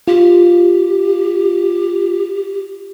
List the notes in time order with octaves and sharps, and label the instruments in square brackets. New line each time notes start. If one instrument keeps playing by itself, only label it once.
[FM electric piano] F4 [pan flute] G4